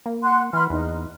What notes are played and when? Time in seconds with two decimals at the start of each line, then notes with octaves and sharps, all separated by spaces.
0.06 A#3
0.23 F#5 C6 F#6
0.53 E3 B5 C6 F6
0.70 E2 D#4